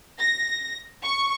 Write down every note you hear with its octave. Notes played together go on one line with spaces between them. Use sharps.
A#6
C#6